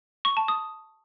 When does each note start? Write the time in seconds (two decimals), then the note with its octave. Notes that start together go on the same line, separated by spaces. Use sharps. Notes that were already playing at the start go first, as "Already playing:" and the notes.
0.25 C#6
0.37 A5
0.48 D#6